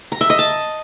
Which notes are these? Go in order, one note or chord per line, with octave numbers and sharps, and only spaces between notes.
A#5
E5
D#5
A5